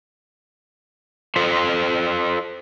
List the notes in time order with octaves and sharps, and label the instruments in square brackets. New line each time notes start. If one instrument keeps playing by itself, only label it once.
[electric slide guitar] F4 A4 C5